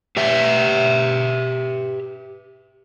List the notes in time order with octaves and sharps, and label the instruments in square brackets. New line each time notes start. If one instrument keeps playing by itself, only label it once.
[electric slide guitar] G4 B4 E5